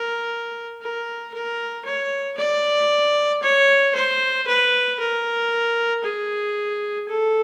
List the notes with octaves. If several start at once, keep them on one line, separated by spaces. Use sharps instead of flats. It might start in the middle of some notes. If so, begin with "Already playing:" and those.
Already playing: A#4
A#4
A#4
C#5
D5
C#5
C5
B4
A#4
G#4
A4